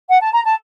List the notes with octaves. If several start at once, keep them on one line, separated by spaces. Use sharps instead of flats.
F#5
A5
A#5
A5